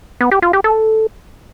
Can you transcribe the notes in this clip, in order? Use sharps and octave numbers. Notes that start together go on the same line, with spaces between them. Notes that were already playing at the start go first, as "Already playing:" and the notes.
B3
G4
F4
G4
A4